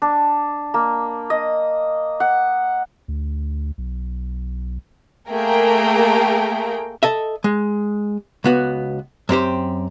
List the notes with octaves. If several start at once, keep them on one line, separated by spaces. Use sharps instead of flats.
D4
A#3
D#5
F#5
D2
B1
A3 A#3 G#4 A#4 G5
A4 D#5 E5
G#3
C#2 B3 F#4
F#2 C4 G4 C5